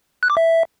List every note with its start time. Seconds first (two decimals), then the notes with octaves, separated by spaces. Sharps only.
0.23 F#6
0.30 D6
0.37 E5